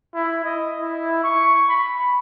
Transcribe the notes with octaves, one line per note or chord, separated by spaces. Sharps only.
E4
D#5
E4
C#6
B5